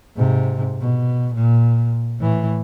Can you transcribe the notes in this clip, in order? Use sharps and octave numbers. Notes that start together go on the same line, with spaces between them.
G#2 C3
B2
A#2
A2 E3